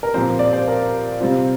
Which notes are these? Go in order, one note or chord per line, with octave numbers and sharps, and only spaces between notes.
A#4
A#2 F3 C4 C5
D5
C5
A#4
C3 G3 C4 F4